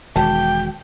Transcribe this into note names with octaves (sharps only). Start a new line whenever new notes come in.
E1 D#3 G#3 F#4 G5 A5